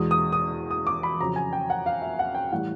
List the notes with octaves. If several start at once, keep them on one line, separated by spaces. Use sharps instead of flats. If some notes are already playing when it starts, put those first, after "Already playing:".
Already playing: E2 B2 G#3 D#6
D#6
D#6
D#6
D6
B5
F2 C#3 F#3 A#5
G#5
G5
F#5
F5
E5
F#5
G5
A2 E3 G3 F#5